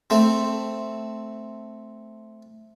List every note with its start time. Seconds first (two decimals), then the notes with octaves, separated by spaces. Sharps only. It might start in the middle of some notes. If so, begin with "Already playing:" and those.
0.10 A3 C4